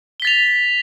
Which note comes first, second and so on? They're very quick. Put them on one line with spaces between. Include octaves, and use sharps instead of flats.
G7 B6 A6 F7